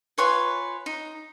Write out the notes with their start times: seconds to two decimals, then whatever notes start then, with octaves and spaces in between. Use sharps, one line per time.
0.18 F4 B4 C#5 G#5
0.86 D#4